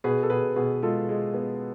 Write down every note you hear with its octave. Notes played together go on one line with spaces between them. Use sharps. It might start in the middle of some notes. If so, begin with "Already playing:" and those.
B2 G#4 B4
A4
B2 G#4 B4
B2 G#4
G#3 F4 A4
G#3
B3